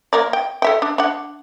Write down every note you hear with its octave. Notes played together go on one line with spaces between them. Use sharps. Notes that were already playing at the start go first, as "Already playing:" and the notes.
A#3 A#4 D5
G5
A4 E5 G5
D4
D4 F#5